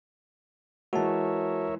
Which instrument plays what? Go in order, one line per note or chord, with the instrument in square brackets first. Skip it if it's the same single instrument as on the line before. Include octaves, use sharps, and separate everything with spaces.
[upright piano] E3 G#3 [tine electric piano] F#4 A5 [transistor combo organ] A#4 C#5 E5